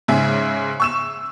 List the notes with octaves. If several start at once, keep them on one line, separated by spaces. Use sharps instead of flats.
G#2 C#3 E5 G#5
C#6 E6 E7